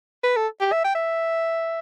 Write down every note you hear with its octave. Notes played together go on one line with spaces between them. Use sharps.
B4
A4
G4
E5
G5
E5